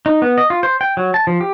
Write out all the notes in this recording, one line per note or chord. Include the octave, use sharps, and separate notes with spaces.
D#4
B3
D#5
F4
C5
G5
F#3
A5
F3
G4